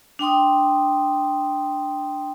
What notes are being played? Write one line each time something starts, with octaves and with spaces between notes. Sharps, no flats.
D4 G5 C6 D#6